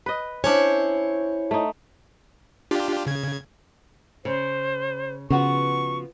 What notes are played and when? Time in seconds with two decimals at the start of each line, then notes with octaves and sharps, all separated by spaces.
0.06 B4 D#5
0.44 C#4 D4 E4 C5 C#5
1.51 A3 D#4
2.71 D4 F4 G4
3.07 C#3 G#6
4.25 C#3 C5
5.30 C#3 F3 B3 F#4 C#6